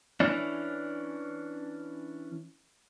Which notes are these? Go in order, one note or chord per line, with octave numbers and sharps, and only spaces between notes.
E3 C#4 D4